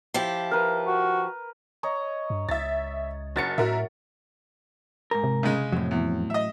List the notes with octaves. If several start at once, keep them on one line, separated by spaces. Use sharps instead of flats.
F3 E4 G4
A#4 B4
F#4
C#5 D#5 A#5
G2
C#2 E5 A6
F#1 F#3 A6 C#7
A2 F#4 A#4 E5
G#2 A#4
C3
C#3 G#3
F2 A2 F#3
E2
D#5 E5